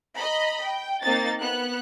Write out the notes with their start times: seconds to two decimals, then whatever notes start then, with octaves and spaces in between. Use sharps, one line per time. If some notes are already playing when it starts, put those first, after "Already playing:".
0.17 D#5 A#5 B5
0.62 G5
1.03 A#3 C4 D#4 A6
1.40 B3 F#6